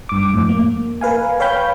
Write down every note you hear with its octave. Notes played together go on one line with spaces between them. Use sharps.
G2 D6
F2 A2
A#3
A#4 B4 F5 G#5
B4 C#5 F5 G5 B5 G6